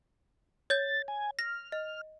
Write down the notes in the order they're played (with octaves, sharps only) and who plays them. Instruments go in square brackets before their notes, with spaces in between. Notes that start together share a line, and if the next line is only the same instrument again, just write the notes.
[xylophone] C#5 G6 [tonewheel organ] A6
[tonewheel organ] G#5
[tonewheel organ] F6 [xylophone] A#6
[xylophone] D#5